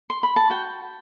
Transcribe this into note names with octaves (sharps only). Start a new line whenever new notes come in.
C6
B5
A5
F#4 G5